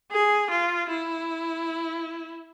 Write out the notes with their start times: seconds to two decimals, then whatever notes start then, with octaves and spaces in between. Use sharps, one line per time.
0.12 G#4
0.51 F4
0.90 E4